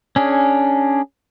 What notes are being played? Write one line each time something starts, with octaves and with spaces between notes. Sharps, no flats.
C#4 D4 G#4